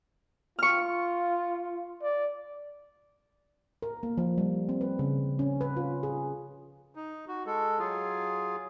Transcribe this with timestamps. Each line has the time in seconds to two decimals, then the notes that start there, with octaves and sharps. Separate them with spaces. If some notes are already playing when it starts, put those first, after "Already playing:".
0.59 F4 C#6 F6
2.02 D5
3.82 A#4
4.03 A#3
4.17 F3
4.38 G3
4.69 C4
4.81 B4
4.99 C#3
5.39 C#4
5.61 B4
5.77 F4
6.03 G#4
6.95 D#4
7.28 F#4
7.46 G#3 A4
7.79 F#3 F4 G#4